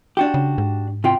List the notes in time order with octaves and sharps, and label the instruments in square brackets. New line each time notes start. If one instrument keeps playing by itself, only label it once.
[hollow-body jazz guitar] D4 F#4 G4
[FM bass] C#3
G#2
[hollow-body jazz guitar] C3 F4 G5